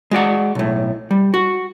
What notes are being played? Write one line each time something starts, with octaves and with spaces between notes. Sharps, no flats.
G#3 F#4 D5 F#5
B1 A2
G3
F#4